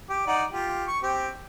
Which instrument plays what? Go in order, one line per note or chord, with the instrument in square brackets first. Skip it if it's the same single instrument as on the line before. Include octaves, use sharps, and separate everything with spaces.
[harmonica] G4 D6
D#4 D5 F#5
F4 G4
C#6
C4 G4